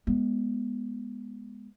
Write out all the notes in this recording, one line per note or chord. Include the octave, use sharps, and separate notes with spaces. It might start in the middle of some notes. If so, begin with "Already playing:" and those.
G#3 B3